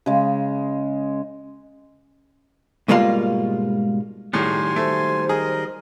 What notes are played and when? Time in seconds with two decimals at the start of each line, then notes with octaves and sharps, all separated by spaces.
0.06 C#3 G#3
2.88 G#2 B2 G3 G#3 A#3 F4
4.34 A2 D#3 F#3 G3 G#4 G#5 C6
4.76 A3 C5
5.29 G#4 A#4 D#5